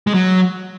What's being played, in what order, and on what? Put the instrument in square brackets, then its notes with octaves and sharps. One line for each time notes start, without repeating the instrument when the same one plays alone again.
[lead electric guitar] G#3
F#3